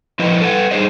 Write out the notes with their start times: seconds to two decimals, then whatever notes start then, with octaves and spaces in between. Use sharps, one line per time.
0.19 F3 E4 B4 D#5
0.41 A4 B4 F#5
0.71 G3 G#3 D#4 G#4 C5 D#5